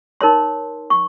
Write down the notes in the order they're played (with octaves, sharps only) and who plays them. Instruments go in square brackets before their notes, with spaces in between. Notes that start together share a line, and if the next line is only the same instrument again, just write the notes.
[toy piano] D#4 A#4 C#5 C6
C#6